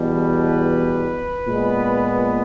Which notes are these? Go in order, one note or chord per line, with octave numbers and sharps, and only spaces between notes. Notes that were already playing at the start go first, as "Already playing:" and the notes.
Already playing: E2 B2 G3
B4
A#2 G#3 B3